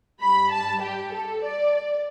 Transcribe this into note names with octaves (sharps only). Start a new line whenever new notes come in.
G2 G3 B5
A5
G4
A4
D5